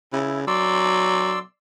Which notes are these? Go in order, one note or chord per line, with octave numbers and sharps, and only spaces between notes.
C#3 E4
F#3 D5 C6 E6